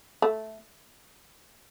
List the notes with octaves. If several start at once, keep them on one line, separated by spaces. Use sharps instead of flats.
A3